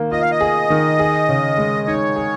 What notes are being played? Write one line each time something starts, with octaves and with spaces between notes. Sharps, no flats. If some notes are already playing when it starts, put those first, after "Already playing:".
Already playing: D#3 A#3
F4 D#5
F5
D#5
G#4
D#3
G#4
C#3
G#3
D#4 C#5
G#4